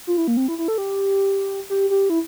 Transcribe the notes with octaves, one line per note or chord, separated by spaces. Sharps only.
F4
E4
A#3
C4
E4
E4
A4
G4
G4
G4
E4